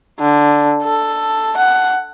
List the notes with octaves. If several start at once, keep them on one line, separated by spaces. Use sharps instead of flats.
D3
A4
F#5